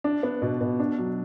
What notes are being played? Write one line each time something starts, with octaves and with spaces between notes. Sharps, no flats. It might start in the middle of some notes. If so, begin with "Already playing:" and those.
D4
B3
B2
B2
D4
F#3